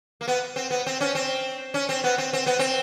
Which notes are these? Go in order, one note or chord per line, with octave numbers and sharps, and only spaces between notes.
A#3
B3
C4
B3
C4
C#4
C4
C#4
C4
B3
C4
C4
B3
C4